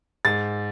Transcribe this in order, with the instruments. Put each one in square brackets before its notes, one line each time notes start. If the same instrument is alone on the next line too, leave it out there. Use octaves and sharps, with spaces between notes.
[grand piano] G#2 A6